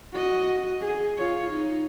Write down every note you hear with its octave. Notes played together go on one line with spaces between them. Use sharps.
F#4 D#5
G#4
F4 C#5
D#4